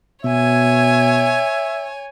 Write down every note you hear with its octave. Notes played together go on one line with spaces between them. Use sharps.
B2 C#5 E5 G#5